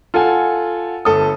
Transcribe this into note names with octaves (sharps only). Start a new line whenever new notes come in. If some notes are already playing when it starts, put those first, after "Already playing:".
F4 A4 F#5 G#5
G1 A4 D#6